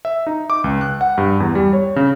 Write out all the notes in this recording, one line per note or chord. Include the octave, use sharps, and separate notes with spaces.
E5
D#4
D6
C#2
F#6
F#5
G2
E2
G3
C#5
C#3